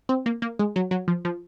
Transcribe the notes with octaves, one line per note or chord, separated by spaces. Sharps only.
C4
A#3
A#3
G#3
F#3
F#3
F3
F3